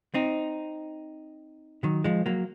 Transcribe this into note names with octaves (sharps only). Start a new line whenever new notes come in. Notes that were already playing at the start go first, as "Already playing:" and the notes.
C4 D#4
D#3 F#3
F3 G#3
F#3 A#3